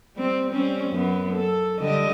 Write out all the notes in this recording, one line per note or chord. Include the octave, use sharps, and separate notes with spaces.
G3 C4
G3 C4 C#4
F#2 B3
A4
D3 G3 D#5